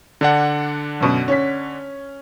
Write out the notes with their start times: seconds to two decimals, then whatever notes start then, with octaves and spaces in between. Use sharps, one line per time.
0.21 D3 D4 F#5
1.00 F#2 B2
1.28 C#4 B6